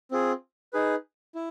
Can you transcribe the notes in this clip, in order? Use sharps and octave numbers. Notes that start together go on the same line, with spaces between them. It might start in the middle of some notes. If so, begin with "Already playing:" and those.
C4 F4 G#4
D#4 G#4 B4
E4